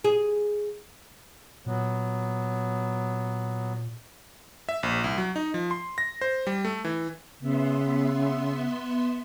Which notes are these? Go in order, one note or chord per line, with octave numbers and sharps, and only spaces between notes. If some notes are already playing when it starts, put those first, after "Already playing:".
G#4
A#2 F#3 B3
E5
A#1
C2
F#3
D#4
F3
C6
A#6
C5
G3
A3
E3
C#3 B3 E5 C6